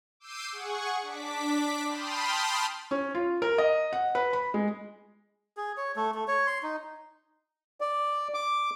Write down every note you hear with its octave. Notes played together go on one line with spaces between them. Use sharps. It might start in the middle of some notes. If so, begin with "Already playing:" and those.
D6 E6 G6 C7 D#7
G#4 F#5 C#6
D4 D6 B6
G5 A5 B5 C6 D#6 F6
C#4
F4
A#4
D#5
F#5
B4
B5
G#3
G#4
C#5
A3
A3
C#5
C6
D#4
D5
D6